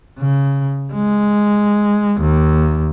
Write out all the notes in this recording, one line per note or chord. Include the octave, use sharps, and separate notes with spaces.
C#3
G#3
D#2